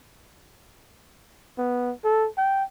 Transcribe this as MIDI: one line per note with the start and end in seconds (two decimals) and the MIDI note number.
1.58 1.92 59
2.04 2.28 69
2.38 2.64 79